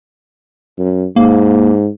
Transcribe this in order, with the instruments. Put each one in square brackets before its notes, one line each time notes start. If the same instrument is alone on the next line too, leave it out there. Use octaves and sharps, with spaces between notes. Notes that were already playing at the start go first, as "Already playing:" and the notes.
[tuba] F#2
[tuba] G#2 [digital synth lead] A#3